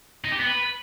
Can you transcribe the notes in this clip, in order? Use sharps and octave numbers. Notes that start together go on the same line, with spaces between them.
D#4
G4
B3
B4